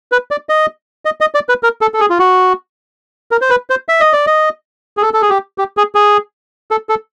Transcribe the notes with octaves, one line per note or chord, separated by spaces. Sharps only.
B4
D5
D#5
D#5
D#5
D5
B4
A#4
A4
A4
G#4
F4
F#4
A#4
C5
B4
C5
E5
D#5
D5
D#5
G#4
A4
A4
G#4
G4
G4
G#4
G#4
A4
A4